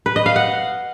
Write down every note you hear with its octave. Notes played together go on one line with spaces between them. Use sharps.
B4
D#5
F5
F#5